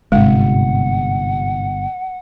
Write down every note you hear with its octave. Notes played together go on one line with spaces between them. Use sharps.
G1 G#2 C3 G#3 F#5